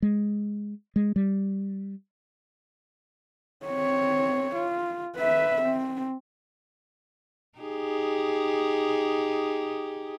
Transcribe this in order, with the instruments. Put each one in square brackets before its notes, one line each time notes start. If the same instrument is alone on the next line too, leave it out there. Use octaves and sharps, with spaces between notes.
[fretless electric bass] G#3
G#3
G3
[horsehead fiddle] C4 C#5
F4
B4 E5
C4
[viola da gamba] D#4 G4 G#4